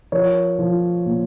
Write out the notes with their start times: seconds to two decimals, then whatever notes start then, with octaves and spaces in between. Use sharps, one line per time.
0.12 F3 A#4 C#5
0.59 F3
1.06 A#2